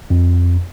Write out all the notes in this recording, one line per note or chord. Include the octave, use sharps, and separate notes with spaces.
F2